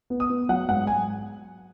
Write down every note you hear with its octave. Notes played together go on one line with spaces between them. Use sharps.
B3
D#6
B3
F#3 F#5
G#2 F#5
G#5